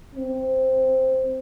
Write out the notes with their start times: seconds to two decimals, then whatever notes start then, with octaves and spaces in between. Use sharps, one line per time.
0.15 C4